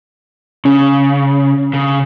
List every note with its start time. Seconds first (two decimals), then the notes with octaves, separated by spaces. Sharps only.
0.65 C#3 C#4
1.74 C#3